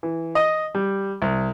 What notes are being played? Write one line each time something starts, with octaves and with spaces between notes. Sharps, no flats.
E3
D#5
G3
C2